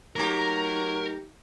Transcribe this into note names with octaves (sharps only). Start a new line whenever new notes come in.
F#3 A3 A#3 D#4 G4 A#4